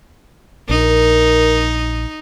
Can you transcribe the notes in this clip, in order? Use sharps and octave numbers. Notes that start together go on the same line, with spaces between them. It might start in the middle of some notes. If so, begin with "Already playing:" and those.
A#1 D#4 A#4